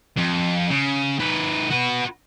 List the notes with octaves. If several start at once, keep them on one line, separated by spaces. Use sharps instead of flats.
F2
C#3
D#3 B4
F#4 B4